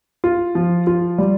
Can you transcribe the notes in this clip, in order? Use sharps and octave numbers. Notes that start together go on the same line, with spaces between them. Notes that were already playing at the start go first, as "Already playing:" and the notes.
F4
F3
F4
G3